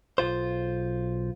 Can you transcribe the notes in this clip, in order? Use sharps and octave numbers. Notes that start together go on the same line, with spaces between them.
B1 F4 C5